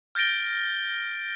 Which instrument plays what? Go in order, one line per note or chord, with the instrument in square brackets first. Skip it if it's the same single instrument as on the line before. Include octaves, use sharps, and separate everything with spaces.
[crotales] F6 G6 A6 A#6 D7 G7